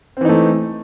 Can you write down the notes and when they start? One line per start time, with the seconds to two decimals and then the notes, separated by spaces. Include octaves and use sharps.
0.17 C4
0.21 E3
0.25 D#4
0.29 A3